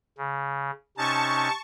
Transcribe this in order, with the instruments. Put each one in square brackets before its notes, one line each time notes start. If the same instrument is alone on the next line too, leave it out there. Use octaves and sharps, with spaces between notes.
[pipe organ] C#3
[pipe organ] C3 C#4 D#4 [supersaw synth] A5 C#6